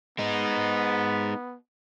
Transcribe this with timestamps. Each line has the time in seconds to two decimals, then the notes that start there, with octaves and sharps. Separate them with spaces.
0.19 G#3 B3 D#4